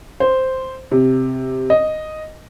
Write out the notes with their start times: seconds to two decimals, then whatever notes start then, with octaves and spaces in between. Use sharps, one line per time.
0.20 C5
0.92 C3
1.70 D#5